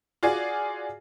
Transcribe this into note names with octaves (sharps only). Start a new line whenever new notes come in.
F4 F#4 G#4 D5 G#5